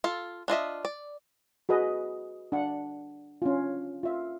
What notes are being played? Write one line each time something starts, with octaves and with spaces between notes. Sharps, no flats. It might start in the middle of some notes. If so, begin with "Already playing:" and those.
F4 A4
D4 F4 D#5 E5
D5
F#4 G#4 B4 D#5
D4 F#5
C#4 D4 F4
F4 E5